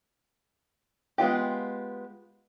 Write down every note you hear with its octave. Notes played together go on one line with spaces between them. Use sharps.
G#3 B3 F4 G4